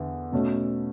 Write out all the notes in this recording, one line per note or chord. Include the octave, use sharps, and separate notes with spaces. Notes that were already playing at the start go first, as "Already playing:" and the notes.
Already playing: E2 D3
B2 A3 C#4